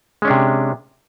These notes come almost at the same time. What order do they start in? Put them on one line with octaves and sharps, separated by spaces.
G#3 C#4 D4 C3